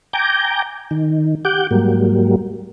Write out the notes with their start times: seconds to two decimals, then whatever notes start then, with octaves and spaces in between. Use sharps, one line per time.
0.13 G5 G#5 A#5 D6 G6
0.91 D#3
1.45 G4 F#5 D6 G6
1.71 G#2 F#3 G3 A#3